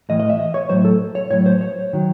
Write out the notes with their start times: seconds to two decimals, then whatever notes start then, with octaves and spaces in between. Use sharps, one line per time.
0.09 A2 E3 D#5
0.20 D#5
0.30 E5
0.40 D#5
0.54 C#5
0.69 A2 F#3 C5
0.85 A4
1.15 C#5
1.30 A2 C#5
1.33 F#3
1.46 C5
1.61 C#5
1.93 D#3 F#3